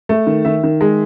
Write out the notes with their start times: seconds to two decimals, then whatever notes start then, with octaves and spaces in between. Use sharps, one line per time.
0.09 A3
0.27 D#3
0.45 D#3 E5
0.63 D#3
0.81 G#3